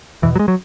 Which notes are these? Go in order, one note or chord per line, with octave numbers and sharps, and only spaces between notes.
E2 B2 E3
F#3
G#3
F#3